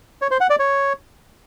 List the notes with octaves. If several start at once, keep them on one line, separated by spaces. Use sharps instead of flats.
C#5
C5
F#5
D5
C#5